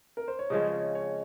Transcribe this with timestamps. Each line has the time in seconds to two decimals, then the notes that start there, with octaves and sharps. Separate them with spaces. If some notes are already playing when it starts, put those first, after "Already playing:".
0.17 A#4
0.28 C5
0.39 C#5
0.50 C#3 F3 G#3 C#4 D#5
0.68 D#5
0.73 C#5
0.95 C#5